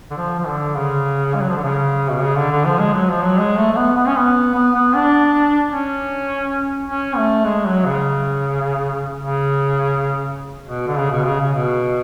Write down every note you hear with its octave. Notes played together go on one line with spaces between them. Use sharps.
D3
F3
F3
D3
C#3
G#3
F#3
F3
D3
C#3
B2
C#3
D3
D3
F3
G#3
F#3
F3
F#3
G#3
A3
A3
B3
B3
C#4
B3
B3
B3
D4
C#4
C#4
A3
G#3
F#3
C#3
C#3
B2
D3
C#3
B2
C#3
C#3
B2